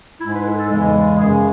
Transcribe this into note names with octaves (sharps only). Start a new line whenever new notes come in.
G#2 G#3 E4
B4
A4
A4
E2 C#3 E3 G#3
F#2 C#3 G#3 G#4